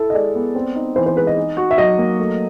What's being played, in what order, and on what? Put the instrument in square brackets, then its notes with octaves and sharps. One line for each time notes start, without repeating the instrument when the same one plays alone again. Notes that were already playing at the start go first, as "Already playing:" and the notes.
Already playing: [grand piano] E4 A4
[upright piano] D#5
[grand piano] G#3 [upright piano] D5
[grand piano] B3
C4
D#4
[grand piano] E3 [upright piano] C5
[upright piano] C5
[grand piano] G#3 [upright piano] B4
[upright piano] D#5
[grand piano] D#4
F#4
[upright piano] E5
[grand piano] F#3 [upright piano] D#5
[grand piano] A#3
A3